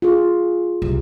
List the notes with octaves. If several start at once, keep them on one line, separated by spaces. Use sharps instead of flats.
F4 G#4
C2